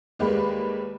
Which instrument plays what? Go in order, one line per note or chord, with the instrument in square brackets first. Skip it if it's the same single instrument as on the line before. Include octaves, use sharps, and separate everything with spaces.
[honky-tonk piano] D#2 G3 G#3 A#3 G4 B4